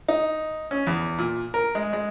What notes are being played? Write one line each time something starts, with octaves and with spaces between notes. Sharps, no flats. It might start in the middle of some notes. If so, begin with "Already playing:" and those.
D#4
C#4
E2
A#2
A#4
G#3
G#3